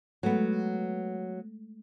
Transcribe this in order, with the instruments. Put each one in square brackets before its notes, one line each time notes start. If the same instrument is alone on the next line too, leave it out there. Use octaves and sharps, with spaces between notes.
[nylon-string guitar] F#3 B3 [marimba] G#3 A3 A4